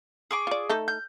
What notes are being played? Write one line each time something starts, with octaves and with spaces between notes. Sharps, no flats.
G#4 C#6 D6
F4 D5
A3 D#4 A4
G6